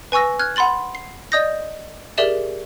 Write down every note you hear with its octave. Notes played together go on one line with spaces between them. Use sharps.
B4 G#5 C#6 E6 A#6
F6 F#6 G#6
F#5 B5 C6 A6 F#7
C7
D5 D#5 D#6 G6 A#6
G4 G#4 A#4 D5 E5 E7